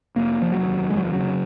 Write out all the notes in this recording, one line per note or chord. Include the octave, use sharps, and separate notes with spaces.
F1 A#3
F1 F3
F#3
D#2
F1 G#3
F#3
F3
C#3 F#3